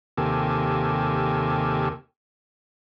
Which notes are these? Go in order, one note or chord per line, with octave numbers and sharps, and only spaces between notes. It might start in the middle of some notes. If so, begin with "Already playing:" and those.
D#2 C3 A#3 G4 A4 G#5